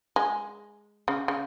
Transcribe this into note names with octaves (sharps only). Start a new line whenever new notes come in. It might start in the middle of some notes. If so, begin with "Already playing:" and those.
G#3
C#3
C#3